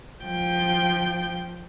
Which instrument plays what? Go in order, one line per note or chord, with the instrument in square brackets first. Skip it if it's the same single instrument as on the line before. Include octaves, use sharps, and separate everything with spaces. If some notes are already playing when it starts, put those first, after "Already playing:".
[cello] F3 G5